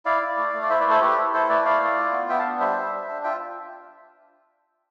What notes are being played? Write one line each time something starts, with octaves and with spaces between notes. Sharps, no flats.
E4 D5 F5
E4
A3
A3
D5
E4 C5 E5
B4 D5
A3 A4 C5
A3 G4 B4
E4
E4 A4 C5
A3 B4 D5
E4 D5 F5
A3
F4
B3
B3 E5 G5
F5 A5
D4
G3 C5 E5
G3
D4
D4
F4 E5 G5